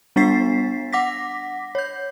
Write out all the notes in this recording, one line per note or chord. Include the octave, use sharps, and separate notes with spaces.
G3 B3 D4 A6 B6 C7
F#5 D6 A#6 B6
C#5 G6